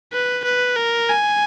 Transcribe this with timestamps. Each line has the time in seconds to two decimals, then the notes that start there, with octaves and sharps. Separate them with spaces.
0.13 B4
0.44 B4
0.76 A#4
1.09 G#5